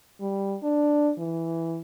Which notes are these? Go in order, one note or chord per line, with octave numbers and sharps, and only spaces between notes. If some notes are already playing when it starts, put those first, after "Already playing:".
G3
D4
E3